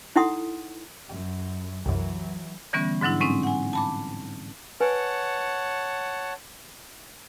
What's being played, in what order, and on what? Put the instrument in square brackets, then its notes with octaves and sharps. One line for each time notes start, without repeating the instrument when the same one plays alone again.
[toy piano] D#4 E4 A4 F#5 C6 D#6
[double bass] F#2
[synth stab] C2 F#2 [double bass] E3 F#3
[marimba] D3 E3 G3 B3 C#4
G#2 D3 F#3 D4 E4
A2 G#3 C4 C#4 D#4
F#5 G#5
A5 B5 D6
[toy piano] B4 G#5 [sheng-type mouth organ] C#5 F#5 A5